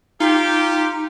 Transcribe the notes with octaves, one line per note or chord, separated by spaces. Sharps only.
D#4 F4 G4